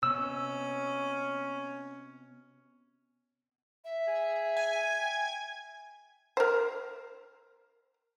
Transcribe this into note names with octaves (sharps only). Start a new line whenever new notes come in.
C3 B3 C#4 E6
E5
G#4
G#5 G#6
G5
A#4 C5